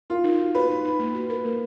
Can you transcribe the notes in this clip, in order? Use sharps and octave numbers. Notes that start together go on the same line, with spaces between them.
F4 A#4
D#4
F#4
F#4 B4
D#4
D#4
A#3
F#4
A#4
A#3